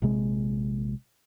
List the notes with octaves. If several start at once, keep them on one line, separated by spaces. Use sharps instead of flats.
A#1 C3 G#3